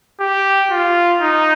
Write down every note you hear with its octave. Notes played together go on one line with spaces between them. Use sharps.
G4
F4
D#4